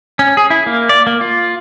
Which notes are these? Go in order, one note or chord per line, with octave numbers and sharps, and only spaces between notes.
C#4
G#4
E4
A#3
D5
A#3
F4